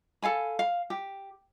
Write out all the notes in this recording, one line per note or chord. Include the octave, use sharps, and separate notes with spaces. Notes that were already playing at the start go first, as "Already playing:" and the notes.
A4 F5 G#5 B5
F5
G4